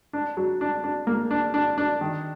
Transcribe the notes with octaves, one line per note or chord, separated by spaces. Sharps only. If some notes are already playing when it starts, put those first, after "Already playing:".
D4
F#3
D4
D4
A#3
D4
D4
D4
D#3